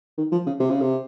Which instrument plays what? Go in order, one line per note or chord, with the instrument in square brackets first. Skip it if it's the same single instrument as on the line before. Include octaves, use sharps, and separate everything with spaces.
[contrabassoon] D#3
F3
C#3
C3
C#3
C3